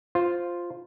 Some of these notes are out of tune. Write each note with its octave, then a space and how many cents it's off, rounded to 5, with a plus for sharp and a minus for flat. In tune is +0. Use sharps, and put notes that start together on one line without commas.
F4 +0 C5 +0